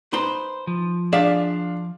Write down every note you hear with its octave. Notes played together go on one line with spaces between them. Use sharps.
D#4 B4 C5 C6
F3
D4 G#4 D5 E5 F5